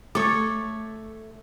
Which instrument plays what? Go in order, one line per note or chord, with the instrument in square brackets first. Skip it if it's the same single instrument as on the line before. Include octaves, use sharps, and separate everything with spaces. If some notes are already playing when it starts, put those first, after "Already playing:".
[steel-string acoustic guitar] A3 [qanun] A4 C#5 [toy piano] D6